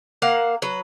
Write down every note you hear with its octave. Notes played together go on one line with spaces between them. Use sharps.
A#3 F5 F#5
F#3 B4